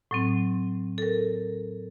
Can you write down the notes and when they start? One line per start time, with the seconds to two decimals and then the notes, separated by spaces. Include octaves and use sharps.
0.11 A2 F#3 C4
0.98 A4 A#4